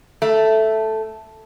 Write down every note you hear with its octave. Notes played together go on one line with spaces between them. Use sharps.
A3